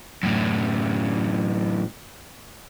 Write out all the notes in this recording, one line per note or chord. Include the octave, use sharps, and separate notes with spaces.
F#2 A2